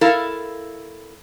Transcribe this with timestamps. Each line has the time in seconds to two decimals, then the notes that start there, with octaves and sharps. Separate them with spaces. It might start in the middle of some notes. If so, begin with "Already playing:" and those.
0.01 E4 A4 A#4 F5